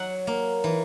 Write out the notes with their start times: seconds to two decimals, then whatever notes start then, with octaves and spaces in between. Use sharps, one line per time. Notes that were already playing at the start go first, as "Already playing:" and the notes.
Already playing: F#3 F#5
0.27 A#3
0.64 E3